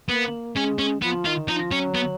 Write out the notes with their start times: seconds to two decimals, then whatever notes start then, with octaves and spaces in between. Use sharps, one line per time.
0.09 A#3 B3
0.55 G#3 C#4
0.78 C#4
1.02 F3 B3
1.26 D#3 F4
1.48 F3 D#4
1.72 F#3 C#4
1.95 B3